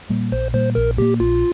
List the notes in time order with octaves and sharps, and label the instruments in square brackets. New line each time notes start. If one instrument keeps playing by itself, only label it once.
[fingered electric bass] A#2 G3 A#3
[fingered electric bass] A#1 [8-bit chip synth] C5
[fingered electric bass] A#2 G3 A#3 [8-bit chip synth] C5
[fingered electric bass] A#1 [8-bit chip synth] A#4
[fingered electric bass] A#2 G3 A#3 [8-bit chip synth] G4
[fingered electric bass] A#1 [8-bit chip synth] F4